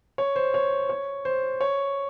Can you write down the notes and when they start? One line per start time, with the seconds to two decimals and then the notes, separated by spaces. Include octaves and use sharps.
0.18 C#5
0.36 C5
0.54 C#5
0.89 C#5
1.25 C5
1.61 C#5